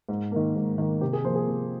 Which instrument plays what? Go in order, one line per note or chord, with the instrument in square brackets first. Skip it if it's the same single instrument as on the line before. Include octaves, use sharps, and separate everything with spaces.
[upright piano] G#2
D#3 A#3
G#2
D#3 A#3
C3 G4
G#4
F3 A#3 C5
G#4
C3